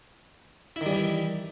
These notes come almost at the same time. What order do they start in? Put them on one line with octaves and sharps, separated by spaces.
E4 D#3 G3 E3